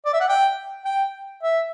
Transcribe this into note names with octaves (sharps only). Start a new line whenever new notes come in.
D5
E5
F#5
G5
G5
E5